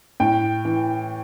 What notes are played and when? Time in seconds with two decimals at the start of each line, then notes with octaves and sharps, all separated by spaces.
0.20 A2 G5
0.65 E3